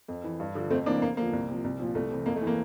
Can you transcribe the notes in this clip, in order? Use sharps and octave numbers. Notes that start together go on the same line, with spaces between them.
F2
E3
G2
D3 F3
F2 A3 C4
C3 E3 A#3 D4
E2 A#3
D3 F3 A#3
C2
C3 F3
C2
A#2 F3
C2 A3
C3 E3
F2 A#3
A3
E3
A#3